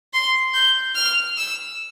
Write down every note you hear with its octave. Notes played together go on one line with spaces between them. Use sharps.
C6
G6
F6
E6